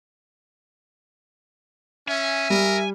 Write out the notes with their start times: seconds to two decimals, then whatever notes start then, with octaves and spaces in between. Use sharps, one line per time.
2.08 C#4 E5 G#5
2.50 G3 A#4